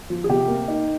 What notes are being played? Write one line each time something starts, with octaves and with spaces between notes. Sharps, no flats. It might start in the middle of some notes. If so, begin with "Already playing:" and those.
F3
G#4
C3 G4
A#3
D#4